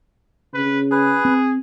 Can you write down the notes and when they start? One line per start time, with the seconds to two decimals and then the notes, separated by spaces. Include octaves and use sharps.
0.54 C#3 B4
0.92 G#4 B4
1.25 C4